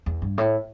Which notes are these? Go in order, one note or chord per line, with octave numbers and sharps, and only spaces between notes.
E2
G2
A2